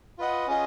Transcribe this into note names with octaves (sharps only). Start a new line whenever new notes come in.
F4 B4 D#5 F#5
C#4 F4 G#4 D#5